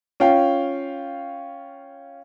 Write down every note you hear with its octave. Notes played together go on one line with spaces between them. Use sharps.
C#4 F4 F5 G5